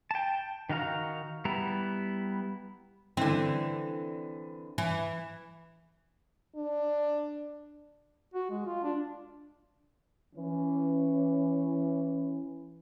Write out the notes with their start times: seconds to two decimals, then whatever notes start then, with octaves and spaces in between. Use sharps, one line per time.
0.11 G5 A5
0.69 D#3 D#4 F#4 F5 A#5
1.45 G3 B3 E4 A#5
3.17 D3 E3 C4
4.78 E3
6.56 D4
8.34 F#4
8.51 G#3
8.66 F4
8.83 D4
10.36 E3 C#4